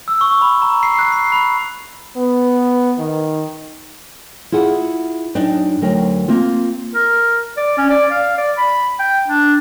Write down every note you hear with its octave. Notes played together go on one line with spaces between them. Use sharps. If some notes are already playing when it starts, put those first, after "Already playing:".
E6
C#6
B5
A#5
C7
F#6
C7
B5
B3
D#3
E4 F4 G#4 F#5
F#2 D4 D#4 G5
D2 F#3 A#4 G5
A#3 C4 F4
A#4
D5
C#4
D5
F5
D5
B5
G5
D4